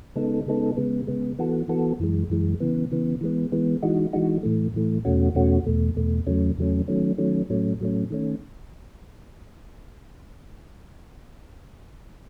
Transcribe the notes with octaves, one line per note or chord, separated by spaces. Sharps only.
C#3 G#3 B3 D#4 A4
C#3 G#3 B3 D#4 A4
C#3 G#3 B3
C#3 G#3 B3
E3 B3 F#4 A4
E3 B3 F#4 A4
F#2 E3 G#3
F#2 E3 G#3
C#3 E3 B3
C#3 E3 B3
E3 G#3 B3
E3 G#3 B3
E3 G#3 D#4 F#4
E3 G#3 D#4 F#4
A2 E3 A3
A2 E3 A3
E2 B2 A3 C#4 F#4
E2 B2 A3 C#4 F#4
E2 B2 A3
E2 B2 A3
E2 C#3 F#3 A3 C#4
E2 C#3 F#3 A3 C#4
D#3 F#3 A3 C#4
D#3 F#3 A3 C#4
A2 F#3 A3 C#4
A2 F#3 A3 C#4
D#3 A3 C#4